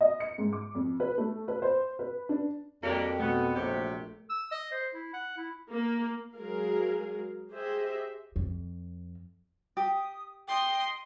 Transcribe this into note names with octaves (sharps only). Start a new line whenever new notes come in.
D#5
C#7
G#2
D6
F2
B4
A3
B4
C5
B4
D4
F2 A#3 D4 F#4 G4 D5
B2 A3 B3
A#1 C3 F#3 G4
E6
D#5
C5
E4
F#5
E4
A#3
F#3 G#3 G#4 A#4 F5
G4 G#4 C5 D#5 E5
F2
G4 D#6
D#5 G5 C6